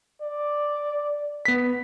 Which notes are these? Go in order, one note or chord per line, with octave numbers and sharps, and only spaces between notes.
D5
B3 B6